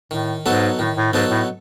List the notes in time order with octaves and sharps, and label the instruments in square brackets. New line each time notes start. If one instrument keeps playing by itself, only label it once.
[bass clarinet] A2 [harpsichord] D#3
[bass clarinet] G#2 [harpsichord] F#3 B3 D#4 A4
[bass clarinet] A2 [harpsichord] D#3
[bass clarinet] A2
[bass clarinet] G#2 [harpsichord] F#3 B3 D#4 A4
[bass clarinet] A2